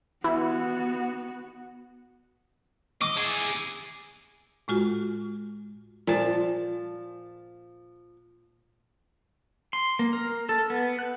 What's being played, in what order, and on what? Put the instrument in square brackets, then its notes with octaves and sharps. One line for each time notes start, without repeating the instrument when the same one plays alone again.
[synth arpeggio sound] E3 [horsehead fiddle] B3 F#4
[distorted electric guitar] D#5 [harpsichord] D6
[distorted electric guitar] E4 G#4
[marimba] A2 G#3 F4 F#4
[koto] A#2 A5 [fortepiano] F3
[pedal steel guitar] C6
A#3
A#4
A4
B3
F#6